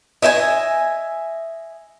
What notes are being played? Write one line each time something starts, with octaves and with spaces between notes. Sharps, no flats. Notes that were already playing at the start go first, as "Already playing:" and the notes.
D#5 E5 G5 G#5